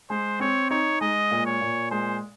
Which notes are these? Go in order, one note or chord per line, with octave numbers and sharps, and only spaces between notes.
G#3 C5
C4 C#5
D#4 C#5
G#3 D#5
A#2
C#5
A#2
G#3 C5